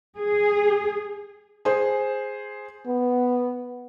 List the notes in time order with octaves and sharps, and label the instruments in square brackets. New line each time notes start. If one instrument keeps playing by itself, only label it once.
[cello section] G#4
[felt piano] G#4 C5
[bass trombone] B3